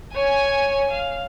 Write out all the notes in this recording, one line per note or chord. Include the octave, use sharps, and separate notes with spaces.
C#5 G#5
F5